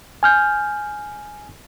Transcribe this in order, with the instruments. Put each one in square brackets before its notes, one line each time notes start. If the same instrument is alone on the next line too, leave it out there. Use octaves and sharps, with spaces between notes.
[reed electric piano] G#5 F6 G6